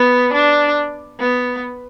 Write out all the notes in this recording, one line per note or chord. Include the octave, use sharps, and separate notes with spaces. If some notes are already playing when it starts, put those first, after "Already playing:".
Already playing: B3
D4
B3